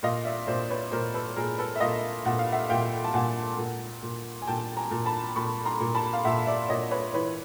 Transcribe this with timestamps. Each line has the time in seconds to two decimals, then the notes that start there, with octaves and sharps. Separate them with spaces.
0.03 A#2 D#5 F5
0.25 D5 E5
0.47 A#2 C5 D5
0.70 B4 C#5
0.91 A#2 A#4 C5
1.14 A4 B4
1.36 A#2 G#4 A#4
1.58 A4 B4
1.76 E5
1.80 A#2 D#5 F5
2.25 A#2 F#5
2.39 F5
2.52 E5 F#5
2.69 A#2 F5 G5
3.04 A5
3.14 A#2 F#5 G#5
3.58 A#2
4.03 A#2
4.42 G#5
4.47 A#2 G5 A5
4.77 G#5 A#5
4.91 A#2
5.06 A5 B5
5.36 A#2 B5 C#6
5.65 A#5 C6
5.80 A#2
5.95 A5 B5
6.13 F5
6.24 A#2 E5 F#5
6.46 D5 E5
6.69 A#2 C#5 D#5
6.91 B4 C#5
7.14 E3 B4 C#5